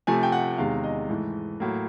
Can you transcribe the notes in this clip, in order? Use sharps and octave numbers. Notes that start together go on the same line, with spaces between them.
C3 F3 A3 G#5
G5
F#5
E2 C3 D#3 G#3 F5
D#5
G#2 E3 A3
A2 F#3 A#3